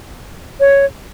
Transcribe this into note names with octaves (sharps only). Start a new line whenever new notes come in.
C#5